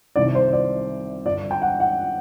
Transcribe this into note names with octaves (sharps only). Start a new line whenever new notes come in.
C2 C3 D#3 D5
C5
D5
G2 D3 D5
G5
F#5
F#5